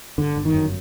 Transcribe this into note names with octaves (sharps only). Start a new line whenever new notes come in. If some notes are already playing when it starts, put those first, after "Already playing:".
G1 D3
G1
D#3
F#2